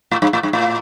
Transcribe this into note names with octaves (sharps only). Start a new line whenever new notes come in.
A2
G2
A2
G2
A2